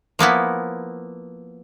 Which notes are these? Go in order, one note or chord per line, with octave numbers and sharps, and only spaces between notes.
F3 A#3 B3 E4